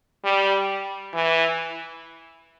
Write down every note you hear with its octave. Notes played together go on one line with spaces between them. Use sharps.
G3
E3